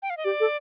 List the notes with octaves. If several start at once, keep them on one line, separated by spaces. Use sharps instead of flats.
G5
F5
D#5
G4 D5
A4